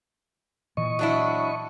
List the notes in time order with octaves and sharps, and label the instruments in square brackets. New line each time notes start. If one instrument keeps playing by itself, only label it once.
[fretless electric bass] A#2 E3 [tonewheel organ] D#5 C#6
[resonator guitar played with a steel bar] F#3 D4 E4